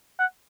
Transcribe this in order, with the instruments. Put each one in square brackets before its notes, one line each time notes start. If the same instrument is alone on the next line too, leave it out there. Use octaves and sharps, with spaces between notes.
[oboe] F#5